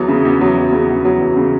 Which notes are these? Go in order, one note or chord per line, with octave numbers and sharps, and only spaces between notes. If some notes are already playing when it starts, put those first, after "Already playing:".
Already playing: E2 F#3
C#3
E2
F#3
E2
C#3
E2
F#3
E2
C#3